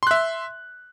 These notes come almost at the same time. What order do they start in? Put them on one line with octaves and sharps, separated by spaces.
C6 F#6 E5